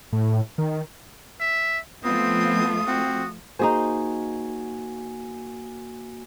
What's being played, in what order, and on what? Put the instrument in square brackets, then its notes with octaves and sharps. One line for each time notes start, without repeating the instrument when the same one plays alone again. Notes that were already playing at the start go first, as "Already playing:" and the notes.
[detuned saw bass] A2
D#3
[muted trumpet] E5
[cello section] F3 A3 F4 [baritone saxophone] B3 [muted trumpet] C4 [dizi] D#6
[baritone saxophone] C4 [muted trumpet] F#4
[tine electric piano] A#3 F#4 G#5 [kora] D#4 G#4 C5